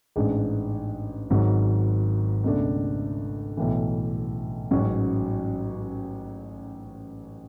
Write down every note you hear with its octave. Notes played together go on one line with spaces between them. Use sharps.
A1 G#2 G#3 D4
G#1 G#2 F#3
C#2 B2 A3 D4
B1 A2 E3
A1 G#2 F#3 C#4 F#4